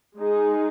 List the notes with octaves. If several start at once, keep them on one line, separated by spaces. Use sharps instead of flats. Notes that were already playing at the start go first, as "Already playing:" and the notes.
G#3 D#4 G#4